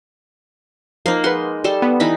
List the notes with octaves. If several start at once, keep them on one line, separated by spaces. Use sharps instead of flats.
F3 A#3 D#4 C7
G#3 B4 F#5 C6
G3 A4 C6
B3
E3 D#4 B5